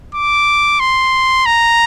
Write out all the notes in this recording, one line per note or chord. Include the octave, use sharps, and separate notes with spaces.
D6
C6
A#5